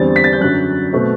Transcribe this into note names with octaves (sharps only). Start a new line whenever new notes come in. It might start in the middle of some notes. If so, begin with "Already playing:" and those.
Already playing: E2 D3 G3 C4 A6
B6
A6
G6
F#2 D3 F#3 F#6
B2 A3 C4